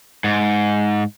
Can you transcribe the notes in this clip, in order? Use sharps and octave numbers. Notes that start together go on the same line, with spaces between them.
G#2